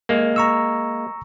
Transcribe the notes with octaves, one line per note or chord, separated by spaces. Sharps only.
G#3 A#3 A#4
A#5 C#6 E6